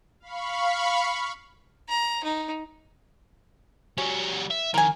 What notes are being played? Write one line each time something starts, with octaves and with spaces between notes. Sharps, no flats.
F5 B5 C#6
A#5
D#4
G3 C#4 F#4
E5
F2 D#3 A#4 G#5